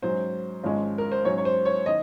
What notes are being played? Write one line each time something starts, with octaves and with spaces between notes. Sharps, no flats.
G#2 F#3 C#4 C5
G#1 G#2 F3 G#3 C#4
A#4
C5
G#2 F#3 C#4 C#5
C#5
C5
C#5
D#3 D#5